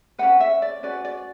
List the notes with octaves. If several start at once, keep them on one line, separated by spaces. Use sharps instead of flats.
C#4 F#4 B4 F#5
E5
D5
C#4 F#4 B4 D5
D5